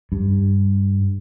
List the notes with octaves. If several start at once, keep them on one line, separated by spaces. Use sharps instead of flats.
G2